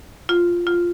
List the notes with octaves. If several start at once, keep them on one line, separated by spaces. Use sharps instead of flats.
F4
F4